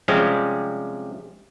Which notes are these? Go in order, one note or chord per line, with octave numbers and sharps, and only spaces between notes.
C3 F3 G3 G#3 C4 C#4